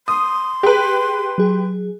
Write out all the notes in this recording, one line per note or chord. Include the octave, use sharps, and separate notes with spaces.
C6 D#6
G4 G#4 B4
F#3 G#4